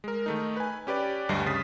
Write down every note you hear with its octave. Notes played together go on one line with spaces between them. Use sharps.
G#3 A#4
D#3 A3 D#4
B4 G#5
C#4 G4 B4 D5
D2 G2 G3 D#5 C7
C#3 D#6 A6 B6